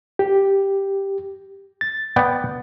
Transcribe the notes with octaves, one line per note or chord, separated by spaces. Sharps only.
G4
A6
B3 D5 G5